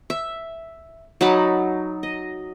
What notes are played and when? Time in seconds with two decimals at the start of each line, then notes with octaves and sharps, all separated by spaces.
0.10 E5
1.21 F#3 D#4 A5 B5
2.03 D#5